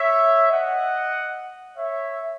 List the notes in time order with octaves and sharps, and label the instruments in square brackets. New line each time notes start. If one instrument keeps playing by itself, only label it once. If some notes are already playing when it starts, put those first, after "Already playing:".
Already playing: [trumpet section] C#5 E5
D#5 F#5
C#5 E5